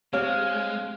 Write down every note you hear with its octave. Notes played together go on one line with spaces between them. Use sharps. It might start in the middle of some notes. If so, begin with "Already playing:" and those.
G#3 C4 D4 G4 C#5 F5 F6